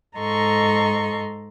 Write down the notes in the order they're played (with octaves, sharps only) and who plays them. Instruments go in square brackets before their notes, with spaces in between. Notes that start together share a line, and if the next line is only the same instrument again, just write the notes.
[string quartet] G#2 A4 D#5 A#5 C6 C#6